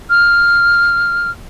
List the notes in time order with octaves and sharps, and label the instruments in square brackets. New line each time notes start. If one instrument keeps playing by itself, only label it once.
[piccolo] F6